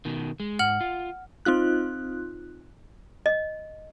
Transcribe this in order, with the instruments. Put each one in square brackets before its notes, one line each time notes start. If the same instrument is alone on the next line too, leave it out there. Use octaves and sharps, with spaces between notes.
[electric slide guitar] B2 D#3
G#3
[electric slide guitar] G#2 [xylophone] F#5 F6 F#7
[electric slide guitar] F4
[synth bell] C4 D#4 F4 F#6
[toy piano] D#5